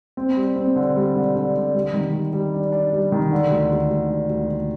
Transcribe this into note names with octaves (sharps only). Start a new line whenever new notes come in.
C4
G3
C4
D3
G3
D3
D3
D3
G3
D#3
G3
G3
D4
D4
G3
D#3
D3
D2
D2
D2
D3
D2
D2